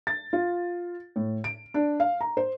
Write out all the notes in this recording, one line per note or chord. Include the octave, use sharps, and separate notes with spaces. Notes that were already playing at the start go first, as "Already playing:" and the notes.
A6
F4
A2
D7
D4
F5
A#5
C5